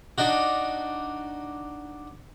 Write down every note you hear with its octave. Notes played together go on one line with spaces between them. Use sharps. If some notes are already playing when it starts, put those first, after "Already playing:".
D4 D#4 F#4